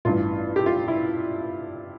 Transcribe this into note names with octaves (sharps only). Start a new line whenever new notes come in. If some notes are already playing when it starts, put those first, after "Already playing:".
A1 G2 E3 F4
G4
F4
E4